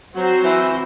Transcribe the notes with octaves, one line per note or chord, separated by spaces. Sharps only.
F#3 C4 F#4 C5
E3